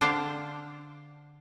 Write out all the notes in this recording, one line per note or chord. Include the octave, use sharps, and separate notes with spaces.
D3 D4 C5 F5 G5 A5